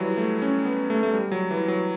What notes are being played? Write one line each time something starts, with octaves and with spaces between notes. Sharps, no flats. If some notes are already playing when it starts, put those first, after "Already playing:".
Already playing: E3 F#3 G3
A3
C#4
B3
A3
A3
G3
F#3
E3
F#3